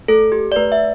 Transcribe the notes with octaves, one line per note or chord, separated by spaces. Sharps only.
A3 A4
G4
D5
A3 B4
E5